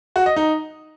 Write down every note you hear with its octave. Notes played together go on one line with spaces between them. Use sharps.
F#4
D#5
D#4